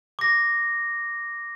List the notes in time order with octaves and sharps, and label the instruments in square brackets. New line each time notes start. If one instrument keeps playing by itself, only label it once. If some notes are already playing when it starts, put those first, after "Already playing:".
[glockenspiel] D6 A#6